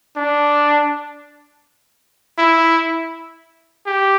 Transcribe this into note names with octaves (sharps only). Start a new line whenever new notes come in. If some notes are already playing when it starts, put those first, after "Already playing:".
D4
E4
G4